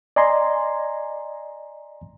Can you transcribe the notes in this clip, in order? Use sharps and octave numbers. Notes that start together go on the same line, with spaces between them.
D5 D#5 G#5 A#5 C6